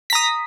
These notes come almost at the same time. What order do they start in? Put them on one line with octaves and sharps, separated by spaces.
B6 A#5 D#6